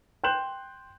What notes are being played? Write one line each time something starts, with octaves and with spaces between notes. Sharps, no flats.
G5 C6 F#6 G6 E7 F#7